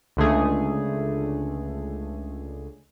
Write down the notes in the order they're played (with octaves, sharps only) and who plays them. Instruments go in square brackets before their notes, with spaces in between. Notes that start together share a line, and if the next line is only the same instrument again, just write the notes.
[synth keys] C#2 D3 A3 G#4